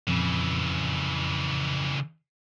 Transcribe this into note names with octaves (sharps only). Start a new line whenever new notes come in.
F2 A#2 C#3 E3 F3